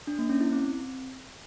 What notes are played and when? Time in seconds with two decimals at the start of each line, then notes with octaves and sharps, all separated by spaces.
0.07 D4
0.18 A#3
0.30 C#4
0.41 E4
0.52 C4